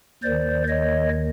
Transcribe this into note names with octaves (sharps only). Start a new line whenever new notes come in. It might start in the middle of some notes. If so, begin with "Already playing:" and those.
D#2 D#3 C5 D5
C#5 D#5